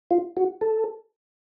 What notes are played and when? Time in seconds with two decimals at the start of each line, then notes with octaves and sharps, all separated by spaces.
0.11 F4
0.37 F#4
0.61 A4